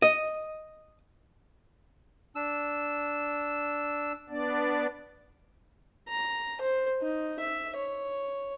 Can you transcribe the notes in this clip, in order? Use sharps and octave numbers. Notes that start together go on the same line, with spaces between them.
D#5
D4 E6
B3 D4 D5
A#5
C5
D#4
E5
C#5